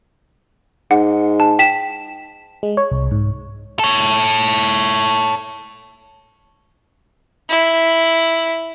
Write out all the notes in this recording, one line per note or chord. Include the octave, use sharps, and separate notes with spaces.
G#2 F#5
A5
G5 B6 E7
G#3
C#5
C2
G#2
A4 C#5
E4